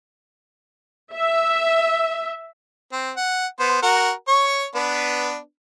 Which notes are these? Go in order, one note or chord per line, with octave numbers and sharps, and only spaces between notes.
E5
C4
F#5
B3 C5
F#4 A#4 F#5
C#5 C#6
B3 D4 B4